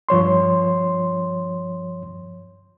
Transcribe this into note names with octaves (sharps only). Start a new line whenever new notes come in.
G2 F3 C#5 C6